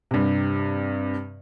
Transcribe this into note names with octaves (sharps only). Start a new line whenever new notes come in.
G2 C3